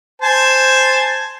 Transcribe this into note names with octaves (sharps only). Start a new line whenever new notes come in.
C5 G#5 A5